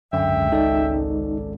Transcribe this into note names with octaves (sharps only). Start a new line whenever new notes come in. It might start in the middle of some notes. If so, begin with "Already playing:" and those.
G#1 C#2 F#2 D3 E5 G5
D#4 A4 D5